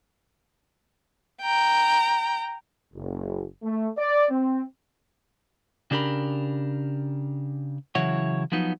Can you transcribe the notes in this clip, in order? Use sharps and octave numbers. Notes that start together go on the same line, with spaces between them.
G5 A#5
F#1
A3
D5
C4
C#3 D4 G4 A#4 B5
C#3 E3 F#3 E4 C#5 F#5
F3 F#3 B3 D#4